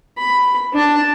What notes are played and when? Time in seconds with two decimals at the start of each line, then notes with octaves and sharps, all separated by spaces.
0.18 B5
0.73 D4 A5